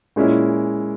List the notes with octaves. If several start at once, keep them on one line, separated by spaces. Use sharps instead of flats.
A#2 G#3 C#4 E4